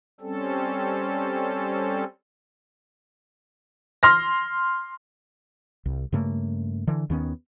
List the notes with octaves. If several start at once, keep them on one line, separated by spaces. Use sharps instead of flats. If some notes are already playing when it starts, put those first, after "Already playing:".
G3 C4 C#4 A4
C6 F6 A#6
C2
G2 C#3 A3 A#3
D3 E3
D#2 D#3 B3 C#4